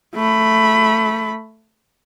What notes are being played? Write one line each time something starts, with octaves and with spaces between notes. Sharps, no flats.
A3 B5